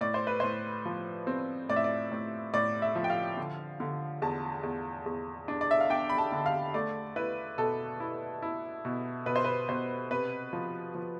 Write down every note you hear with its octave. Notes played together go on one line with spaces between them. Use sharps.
A2 D5
C5
B4
A2 C5
F3
C4
A2 D5
E5
D5
A2
A2 D5
E5
F3
G5
F5
D3
D3
E2 A5
E2
E2
D4
D5
E5
F5
D4 G5
B5
A5
D3
F5
A3 D5
E4 B4
B2 A4
E4
E4
B2
B2 B4
C5
B4
B2 C5
C3 B4
F3
F3